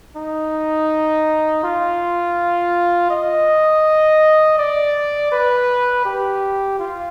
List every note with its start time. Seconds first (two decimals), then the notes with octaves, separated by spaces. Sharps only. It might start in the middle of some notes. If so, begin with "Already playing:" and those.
0.16 D#4
1.63 F4
3.10 D#5
4.58 D5
5.32 B4
6.05 G4
6.79 F4